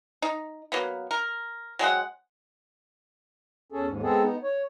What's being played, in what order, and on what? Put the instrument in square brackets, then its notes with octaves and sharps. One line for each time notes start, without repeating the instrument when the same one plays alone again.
[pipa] D#4
F#3 A#3 B3
A#4
F#3 G#3 C4 F#5
[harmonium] E2 C#4 G#4 A4
D#2 G#2
G#3 B3 C4 G#4 A4
B3 D#4
C#5